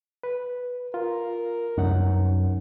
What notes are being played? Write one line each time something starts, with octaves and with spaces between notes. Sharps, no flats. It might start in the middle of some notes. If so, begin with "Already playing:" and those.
B4
F4 A#4
C2 F#2 F#3 D#4 F#5